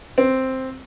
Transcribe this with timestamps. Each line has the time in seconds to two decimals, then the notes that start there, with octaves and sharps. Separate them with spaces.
0.18 C4